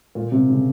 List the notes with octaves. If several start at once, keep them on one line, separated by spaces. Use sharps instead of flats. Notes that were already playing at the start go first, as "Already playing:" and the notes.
A#2
C3
C#3